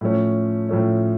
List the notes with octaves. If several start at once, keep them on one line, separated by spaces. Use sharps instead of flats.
A2 F3 A3 C#4
A2 F3 A3 C#4